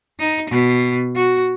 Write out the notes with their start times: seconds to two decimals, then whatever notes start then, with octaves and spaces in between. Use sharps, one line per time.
0.19 D#4
0.50 B2
1.15 F#4